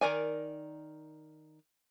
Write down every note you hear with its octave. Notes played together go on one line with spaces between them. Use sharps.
D#3 A#4 D5 G#5